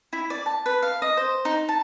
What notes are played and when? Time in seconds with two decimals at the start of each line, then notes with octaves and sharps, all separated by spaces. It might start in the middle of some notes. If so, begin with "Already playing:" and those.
0.13 E4
0.30 D5
0.46 A5
0.66 B4
0.82 F5
1.02 D#5
1.17 C5
1.45 D#4
1.69 A5